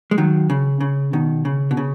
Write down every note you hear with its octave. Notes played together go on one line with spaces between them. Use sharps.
G#3
D#3 F#3
C#3
C#3
B2 D#3
C#3
B2
C#3